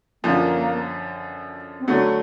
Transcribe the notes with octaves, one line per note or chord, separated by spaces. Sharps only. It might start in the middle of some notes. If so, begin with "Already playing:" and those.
F#2 D3 F3 A#3
C4
D3 F#3 A3 B3